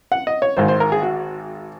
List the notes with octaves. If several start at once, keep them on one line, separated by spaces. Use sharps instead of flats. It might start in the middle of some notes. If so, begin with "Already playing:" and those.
F#5
D#5
C#5
G#1 G#2 D#3 C5
C5
A#4
G#4
F#4